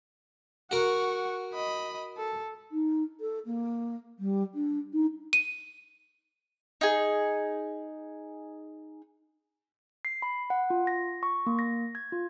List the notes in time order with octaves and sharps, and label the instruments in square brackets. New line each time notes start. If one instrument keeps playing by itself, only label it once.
[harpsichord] F#4 A#4 [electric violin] F#5 C#6
[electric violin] D#5 B5
A4
[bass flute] D#4
A4
A#3
G3
D4
D#4
[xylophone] D#7
[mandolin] D#4 G#4
[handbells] C7
B5
F#5
F4
A#6
C#6
A#3
A#6
G#6
F4